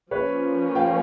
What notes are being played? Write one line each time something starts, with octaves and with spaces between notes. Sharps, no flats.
F3 A#3 C#4 B4 C#5
F5 G5